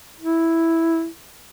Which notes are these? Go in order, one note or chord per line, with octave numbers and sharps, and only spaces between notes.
E4